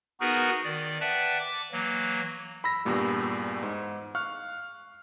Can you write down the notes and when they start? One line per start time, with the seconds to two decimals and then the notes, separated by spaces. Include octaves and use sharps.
0.20 B3 D#4 F#4 G#4 A#4 B4
0.64 D#3 D5
1.00 B4 D5 E5 F#5 G5 A5
1.39 D6
1.72 E3 F#3 A#3
2.64 B5 E6 A#6
2.85 E2 G2 A#2 G3
3.63 G#2
4.15 F5 C#6 F6 F#6